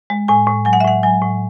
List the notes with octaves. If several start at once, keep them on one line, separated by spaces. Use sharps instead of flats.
G#3
A2 G#5
A2
F#3 G#5
F#5
E5
A2 F#5
F#3 G#5
A2